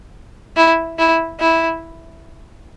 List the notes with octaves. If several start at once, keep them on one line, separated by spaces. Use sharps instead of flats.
E4
E4
E4